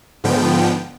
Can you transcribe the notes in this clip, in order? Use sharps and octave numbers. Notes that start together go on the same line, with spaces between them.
G#2 D3 F3 B3 G5